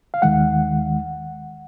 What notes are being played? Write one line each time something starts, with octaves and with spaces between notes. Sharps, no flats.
F5
D#2 D#3 G#3 F#5